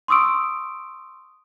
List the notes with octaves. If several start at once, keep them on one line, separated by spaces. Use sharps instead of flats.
C6 C#6 D#6 E6 D7